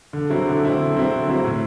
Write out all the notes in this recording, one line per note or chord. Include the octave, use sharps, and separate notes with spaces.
D3
F#3 C4 E4
D3
F#3 C4 E4
D3
F#3 C4 E4
D3
F#3 C4 E4
A2